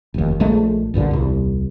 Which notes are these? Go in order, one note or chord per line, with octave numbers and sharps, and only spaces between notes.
F1 D#2
A#1 A#2 G#3 A3
A#1 G2 A#2 D3
D#1 C2